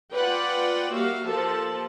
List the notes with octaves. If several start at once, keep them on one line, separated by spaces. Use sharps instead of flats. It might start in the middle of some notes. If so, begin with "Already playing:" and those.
F4 B4 D5 F#5 G5
G3 A#3 F#4 G4 E5 F5
F3 A#3 G4 A4 A5